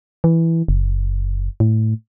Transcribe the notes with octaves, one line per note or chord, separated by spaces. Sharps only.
E3
F#1
A2